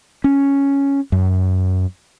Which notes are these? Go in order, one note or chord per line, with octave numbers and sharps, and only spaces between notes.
C#4
F#2